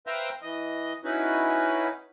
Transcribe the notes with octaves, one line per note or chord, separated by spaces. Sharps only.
B4 C5 E5 F5 G5 A#5
E3 D#5
C#4 D#4 E4 F#4 B4